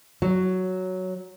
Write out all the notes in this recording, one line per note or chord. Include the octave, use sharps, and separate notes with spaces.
F#3